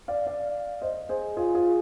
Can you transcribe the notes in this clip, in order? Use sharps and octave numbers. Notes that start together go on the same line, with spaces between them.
D5 F5
D5 F5
C5 D#5
G#4 C5
F4 G#4
F4 G#4